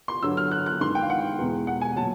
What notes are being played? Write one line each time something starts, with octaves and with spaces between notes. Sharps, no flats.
C6
G2 D3 F#3 E6
F6
F#6
F#6
G2 D#3 G#3 C6
G5
F5
F#5
E2 B2 G#3
F#5
G#5
A#2 F#3 A5